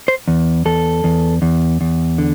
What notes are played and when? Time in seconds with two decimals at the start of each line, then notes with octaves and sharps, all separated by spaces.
0.08 C5
0.28 E2
0.65 E2 A4
1.04 E2
1.42 E2
1.81 E2
2.18 D3